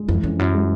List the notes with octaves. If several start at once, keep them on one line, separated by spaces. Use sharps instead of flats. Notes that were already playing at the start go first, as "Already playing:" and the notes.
Already playing: G#3
F2 E3
F2 C#4
F#2 E4
G#3